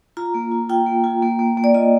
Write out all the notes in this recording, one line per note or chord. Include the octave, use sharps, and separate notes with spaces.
F4 A#5
A#3
F4
F4 G5
A#3
F4
A#3
A#3
A#3
D5
F4 D#5